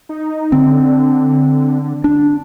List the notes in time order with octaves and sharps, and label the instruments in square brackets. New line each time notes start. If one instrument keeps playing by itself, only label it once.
[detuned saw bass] D#4
[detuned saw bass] D3 [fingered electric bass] C4
[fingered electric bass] D4